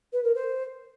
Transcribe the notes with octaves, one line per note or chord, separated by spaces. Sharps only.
B4
A#4
C5